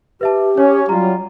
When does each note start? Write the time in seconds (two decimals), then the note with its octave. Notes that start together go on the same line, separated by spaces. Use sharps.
0.21 G4 B4 E5 A5
0.58 C#4 C#5
0.89 F#3 G3 F4 A#5